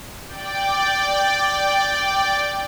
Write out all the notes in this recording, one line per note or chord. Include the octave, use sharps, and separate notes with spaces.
D5 G5